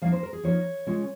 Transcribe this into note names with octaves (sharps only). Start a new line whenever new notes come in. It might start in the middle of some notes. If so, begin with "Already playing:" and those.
F3 A#3 D#4 F5
C5
A#4
G#4
F3 A#3 D#4 C#5
C#3 G#3 C#4 F4